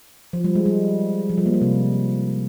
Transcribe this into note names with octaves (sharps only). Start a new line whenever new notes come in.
F3
G3
G#3
G3
F3
G3
A#3
G3
C3